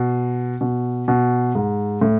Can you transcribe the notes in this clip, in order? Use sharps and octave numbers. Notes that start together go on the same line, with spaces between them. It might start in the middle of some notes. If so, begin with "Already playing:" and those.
Already playing: B2
B2
B2
G#2
A2